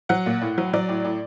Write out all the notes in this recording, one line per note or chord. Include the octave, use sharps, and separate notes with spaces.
F#3 F#5
A#2
A2
F#3
F#3 D5
A2
A2